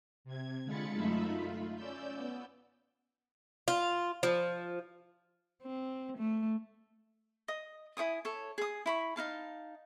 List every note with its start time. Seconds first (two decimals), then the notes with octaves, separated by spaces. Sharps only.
0.24 C3 G#6
0.64 D3 G#3 F4 B5 A6 C#7
0.94 F#2 A3 D#4 F4 E5 B5
1.31 F4
1.75 C#4 D5 E6 G6
2.17 B3
3.68 F4
4.23 F3
5.63 C4
6.18 A3
7.48 D#5 D#6
7.97 E4 C#5 G#5 D#6
8.25 A4 C#5
8.58 G#4 D#6
8.86 E4 B5 C#6
9.16 D#4 E4 F5 A5